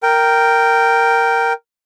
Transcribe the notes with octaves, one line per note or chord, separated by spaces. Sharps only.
A#4 G5